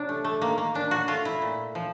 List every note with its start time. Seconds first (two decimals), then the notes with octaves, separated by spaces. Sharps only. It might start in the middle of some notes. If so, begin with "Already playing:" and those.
Already playing: C3 F#3 D4
0.09 A3
0.24 A3
0.41 D#3 A#3
0.58 A#3
0.74 A#2 D4
0.91 F#4
1.08 A3 F4
1.25 E4
1.42 A#2
1.75 F3